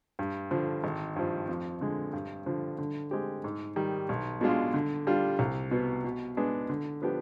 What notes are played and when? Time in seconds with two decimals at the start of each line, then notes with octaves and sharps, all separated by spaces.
0.19 G2
0.51 D3 F3
0.84 G#1
1.16 G2 F3
1.49 F2
1.81 D3 G#3
2.13 G2
2.46 D3 F3
2.78 D3
3.11 G#3 C4 G4
3.44 G#2
3.76 D#3 G3
4.09 B1
4.41 B2 G#3 D4 F4
4.74 D3
5.07 G3 D4 F4
5.39 C2
5.71 B2 B3
6.04 B2
6.37 G#3 B3 D4 G#4
6.70 D3
7.02 F3 B3 D4 G4